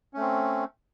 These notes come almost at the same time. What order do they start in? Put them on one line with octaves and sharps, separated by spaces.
C#4 A3 C4